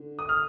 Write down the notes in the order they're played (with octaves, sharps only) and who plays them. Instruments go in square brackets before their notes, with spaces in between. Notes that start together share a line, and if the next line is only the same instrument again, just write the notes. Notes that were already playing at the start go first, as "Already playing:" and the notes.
Already playing: [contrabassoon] D3
[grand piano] D#6
F6